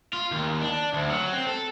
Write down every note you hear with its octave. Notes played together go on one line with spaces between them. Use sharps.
F4
D#2
D4
D2
F#3
C4
A4